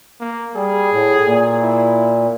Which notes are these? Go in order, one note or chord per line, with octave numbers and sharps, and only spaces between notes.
A#3
G3 G#4
A2
A#2
E4